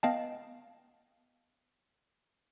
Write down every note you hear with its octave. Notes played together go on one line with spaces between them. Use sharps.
B3 D#5 F5 G5 A5